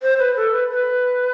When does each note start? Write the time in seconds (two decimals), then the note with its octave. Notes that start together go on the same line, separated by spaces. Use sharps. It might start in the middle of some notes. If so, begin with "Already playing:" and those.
0.02 C5
0.19 B4
0.36 A4
0.52 B4
0.70 B4